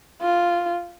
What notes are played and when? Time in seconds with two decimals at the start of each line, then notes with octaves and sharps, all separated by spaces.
0.22 F4